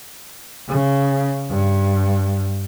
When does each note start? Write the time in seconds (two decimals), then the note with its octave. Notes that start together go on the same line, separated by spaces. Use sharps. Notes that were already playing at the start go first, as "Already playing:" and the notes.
0.68 C#3
1.50 G2